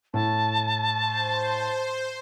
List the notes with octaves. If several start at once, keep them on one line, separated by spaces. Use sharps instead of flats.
A2 A5
C5